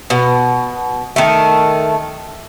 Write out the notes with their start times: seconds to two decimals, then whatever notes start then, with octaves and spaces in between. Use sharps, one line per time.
0.10 B2
1.16 D#3 A3